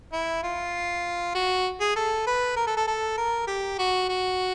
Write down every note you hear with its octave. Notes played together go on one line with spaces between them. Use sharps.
E4
F4
F#4
G#4
A4
B4
A#4
A4
A4
A4
A#4
G4
F#4
F#4